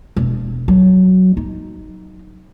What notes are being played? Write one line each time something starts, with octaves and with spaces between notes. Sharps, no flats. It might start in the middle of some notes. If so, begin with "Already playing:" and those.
E1
F#3
D#4